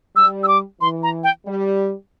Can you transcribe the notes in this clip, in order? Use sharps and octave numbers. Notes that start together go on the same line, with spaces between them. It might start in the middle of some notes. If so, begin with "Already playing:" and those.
G3 E6
E6
D6
E3 C6
A#5
G5
G3